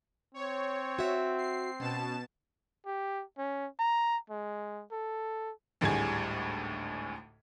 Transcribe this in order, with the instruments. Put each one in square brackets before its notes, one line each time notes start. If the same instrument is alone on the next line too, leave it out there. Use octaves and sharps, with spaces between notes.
[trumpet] C4 [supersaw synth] C#5
[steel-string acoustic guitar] F#4 E5
[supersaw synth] C7
[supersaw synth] B2 A5 E7 [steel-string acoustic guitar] C#4
[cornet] G4
C#4
A#5
G#3
A4
[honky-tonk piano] G#1 D2 A2 G3 G#4 G#6